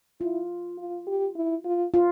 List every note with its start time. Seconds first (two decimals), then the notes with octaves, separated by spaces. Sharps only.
0.20 E4 F4
0.78 F4
1.07 G4
1.35 E4
1.65 F4
1.94 F4